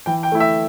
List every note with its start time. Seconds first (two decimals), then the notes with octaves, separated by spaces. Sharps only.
0.06 E3 G5
0.23 G5
0.32 A3 E4
0.40 E5